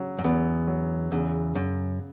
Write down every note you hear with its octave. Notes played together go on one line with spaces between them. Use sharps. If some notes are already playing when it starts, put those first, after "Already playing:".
Already playing: C#3 F#3
F#2
E2 B3
F#3
E2 C#3
F#2 C#3